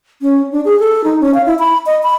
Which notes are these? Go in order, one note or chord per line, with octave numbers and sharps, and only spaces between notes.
C#4
D4
G#4
A4
D#4
C#4
F5
E4
B5
D#5
B5